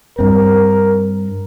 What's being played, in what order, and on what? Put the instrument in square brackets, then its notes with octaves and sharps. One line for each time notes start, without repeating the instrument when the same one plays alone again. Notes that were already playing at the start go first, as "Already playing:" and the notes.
[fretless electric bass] G2 C4 [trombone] A#4